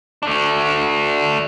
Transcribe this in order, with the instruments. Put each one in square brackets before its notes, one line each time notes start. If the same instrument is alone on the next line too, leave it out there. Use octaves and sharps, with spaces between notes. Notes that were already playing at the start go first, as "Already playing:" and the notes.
[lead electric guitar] A3 D4